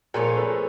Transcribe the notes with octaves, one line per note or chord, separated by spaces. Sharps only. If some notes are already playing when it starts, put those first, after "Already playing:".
A#2 F3 A3 C#4 G#4 A#4
A4 B4